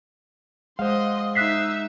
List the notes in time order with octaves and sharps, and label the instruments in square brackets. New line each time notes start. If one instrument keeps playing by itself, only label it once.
[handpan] G#3 F#5 [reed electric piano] C5 F5 [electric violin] D#5 C6
[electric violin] D#4 E5 [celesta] F#6 B6 C7